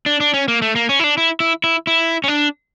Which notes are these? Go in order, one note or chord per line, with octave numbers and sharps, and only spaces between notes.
D4
D4
C#4
A#3
A3
A#3
C#4
E4
D4
E4
E4
E4
E4
C#4
D4